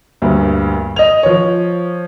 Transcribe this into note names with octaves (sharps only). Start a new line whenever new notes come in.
D2 G2 A#3
D#5 F7
F3 C#5